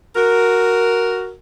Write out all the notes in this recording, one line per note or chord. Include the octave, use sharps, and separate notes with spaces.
F#4 A#4